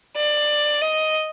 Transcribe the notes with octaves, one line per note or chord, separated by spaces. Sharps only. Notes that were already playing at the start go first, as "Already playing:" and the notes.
D5
D#5